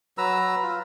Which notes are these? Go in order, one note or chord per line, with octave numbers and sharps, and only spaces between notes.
F#3 B4 A#5 E6
F4